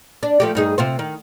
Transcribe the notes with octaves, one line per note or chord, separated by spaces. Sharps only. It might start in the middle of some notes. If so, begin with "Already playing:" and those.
D4
F3 A3 G4
G2 D#4 G#4
C3 F4 C5
D#3